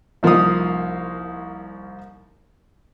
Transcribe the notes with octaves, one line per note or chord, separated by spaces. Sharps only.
C2 F3 A#3 D#4 F5 D#6